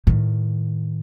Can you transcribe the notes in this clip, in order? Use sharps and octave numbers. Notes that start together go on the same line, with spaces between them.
A2 D#3